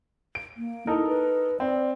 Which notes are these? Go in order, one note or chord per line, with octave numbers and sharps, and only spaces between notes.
D7
A#3
D#4 E4 A4 A#4
B4
C4 D5